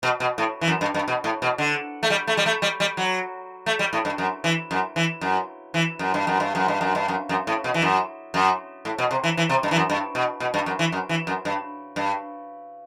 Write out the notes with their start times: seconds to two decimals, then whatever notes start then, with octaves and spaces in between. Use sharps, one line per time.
0.03 B2
0.20 B2
0.38 A2
0.61 E3
0.68 F#2
0.81 G2
0.94 G2
1.08 B2
1.24 A2
1.42 B2
1.58 D3
2.03 A3
2.10 G3
2.27 A3
2.37 G3
2.46 A3
2.62 G3
2.80 G3
2.97 F#3
3.66 A3
3.79 G3
3.93 A2
4.05 G2
4.18 F#2
4.44 E3
4.71 F#2
4.96 E3
5.21 F#2
5.74 E3
5.99 F#2
6.14 G2
6.27 F#2
6.40 G2
6.55 F#2
6.68 G2
6.81 F#2
6.95 G2
7.08 F#2
7.29 F#2
7.47 A2
7.64 B2
7.74 E3
7.82 F#2
8.34 F#2
8.85 A2
8.98 B2
9.11 C3
9.24 E3
9.37 E3
9.49 C3
9.63 G2
9.71 E3
9.76 F#2
9.90 G2
10.15 B2
10.40 B2
10.54 G2
10.66 F#2
10.79 E3
10.92 F#2
11.09 E3
11.27 F#2
11.45 G2
11.96 G2